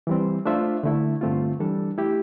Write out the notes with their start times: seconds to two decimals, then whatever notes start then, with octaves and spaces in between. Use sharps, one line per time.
0.07 E3 G3 C4
0.46 A3 D4 F4 C5 E5
0.83 D3 A3 E4
1.21 G2 D3 A3 C4 F4
1.60 E3 G3 D4 A4
1.98 A3 E4 G4